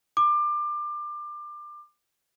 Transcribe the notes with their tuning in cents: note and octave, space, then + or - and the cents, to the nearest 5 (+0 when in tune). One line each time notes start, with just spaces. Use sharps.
D6 +25